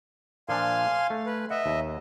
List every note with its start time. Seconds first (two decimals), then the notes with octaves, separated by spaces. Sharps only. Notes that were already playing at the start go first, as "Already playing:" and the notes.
0.49 A#2 F3 D4 F5 G#5 C6
1.10 A3
1.26 B4
1.50 D#5 E5 F#5
1.66 D#2